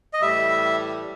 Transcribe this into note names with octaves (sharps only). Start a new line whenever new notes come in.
D#5
A2 E3 G3 E5